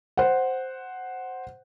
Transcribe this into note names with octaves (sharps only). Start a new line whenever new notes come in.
C5 F#5